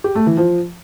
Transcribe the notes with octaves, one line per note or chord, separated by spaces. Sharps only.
G4
A3
E3
F3